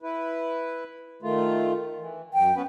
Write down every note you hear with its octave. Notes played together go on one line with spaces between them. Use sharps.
E4 B4
D#3 A3 F4
E3
F#2 G5
B3 C#4 B4